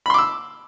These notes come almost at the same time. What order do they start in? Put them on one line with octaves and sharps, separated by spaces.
B5 C6 D6 E6